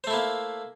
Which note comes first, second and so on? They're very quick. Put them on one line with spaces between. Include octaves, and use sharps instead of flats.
C5 A3 E4 A#3